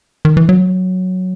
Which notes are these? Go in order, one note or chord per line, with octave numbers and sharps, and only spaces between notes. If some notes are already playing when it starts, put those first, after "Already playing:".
D#3
E3
F#3